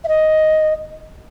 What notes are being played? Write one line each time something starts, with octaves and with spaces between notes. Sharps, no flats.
E5
D#5